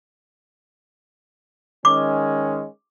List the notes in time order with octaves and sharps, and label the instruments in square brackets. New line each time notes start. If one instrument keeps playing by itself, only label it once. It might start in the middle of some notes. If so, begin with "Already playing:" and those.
[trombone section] D#3 G#3 C#4 [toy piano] D6